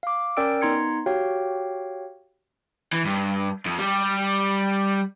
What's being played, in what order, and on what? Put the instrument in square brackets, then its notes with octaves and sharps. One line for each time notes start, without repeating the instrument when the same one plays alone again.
[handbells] F5 D6
C#4 A#4 D5 G5 E6 D7
B3 D#4 A#5 C6 G#6 C#7
F#4 G4 C#5 F5 G5
[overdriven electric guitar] E3
G2
F2
G3